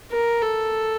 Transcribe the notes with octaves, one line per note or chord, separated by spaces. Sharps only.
A#4
A4